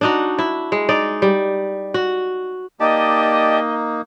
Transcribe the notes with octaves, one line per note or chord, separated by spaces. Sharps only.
D4 D#4 F#4
E4
G#3
D#4 D5
G3
F#4
A#3 D#4 G4 D5 D#5 A5